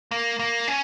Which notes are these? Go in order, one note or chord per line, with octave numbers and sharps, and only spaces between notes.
A#3
A#3
C#4